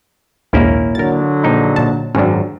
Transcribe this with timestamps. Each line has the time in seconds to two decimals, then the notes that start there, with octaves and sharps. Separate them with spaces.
0.53 A#1 D#2 G#2 A#3 C#4 E4
0.95 D3 F#3 A#4 A6
1.44 A#1 D#4
1.76 A#2 A5
2.15 G#1 F#2 C#4 D4